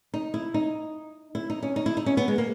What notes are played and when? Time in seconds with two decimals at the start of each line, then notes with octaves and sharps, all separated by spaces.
0.14 D#4
0.34 E4
0.54 D#4
1.35 E4
1.50 D#4
1.63 C#4
1.76 D#4
1.86 E4
1.97 D#4
2.06 C#4
2.17 B3
2.28 G#3
2.38 A#3